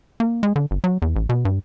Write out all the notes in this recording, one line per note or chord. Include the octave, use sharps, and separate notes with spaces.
A#3
G#3
D3
G1
F#3
E2
A1
B2
G2